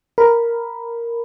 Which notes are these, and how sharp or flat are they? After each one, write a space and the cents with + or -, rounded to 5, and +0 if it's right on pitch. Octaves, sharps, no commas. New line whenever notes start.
A#4 +0 B5 +0